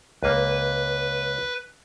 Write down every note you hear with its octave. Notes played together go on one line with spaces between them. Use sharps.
C#2 A#3 B4